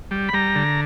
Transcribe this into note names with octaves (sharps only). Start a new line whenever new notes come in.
G3
B5
G3 A#5
D3